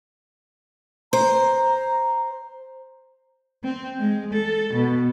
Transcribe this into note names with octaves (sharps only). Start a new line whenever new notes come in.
C5 A#5
C4
G#3
A4
B2